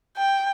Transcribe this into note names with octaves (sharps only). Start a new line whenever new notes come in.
G5